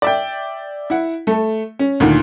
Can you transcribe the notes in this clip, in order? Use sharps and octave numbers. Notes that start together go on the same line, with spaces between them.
D5 E5 G5
E4 F#5
A3 A4
C#4
D2 A#2 D#3